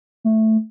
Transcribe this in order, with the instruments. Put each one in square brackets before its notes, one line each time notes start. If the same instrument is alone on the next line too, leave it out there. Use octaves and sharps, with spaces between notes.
[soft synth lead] A3